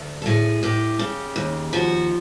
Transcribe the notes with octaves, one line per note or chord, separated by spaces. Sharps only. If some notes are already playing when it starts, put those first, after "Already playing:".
Already playing: D2
A4
A2 G#4
A2 G4
C#3
D#2
F3 F#4